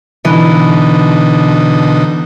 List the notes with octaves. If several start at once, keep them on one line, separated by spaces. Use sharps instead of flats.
B2 D3 E3 D#4